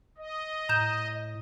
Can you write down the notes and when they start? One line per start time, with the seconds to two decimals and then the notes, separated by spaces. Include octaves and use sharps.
0.18 D#5
0.69 A2 A#5 G6 E7